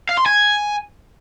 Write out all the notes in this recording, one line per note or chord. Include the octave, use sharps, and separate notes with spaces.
F5
C6
G#5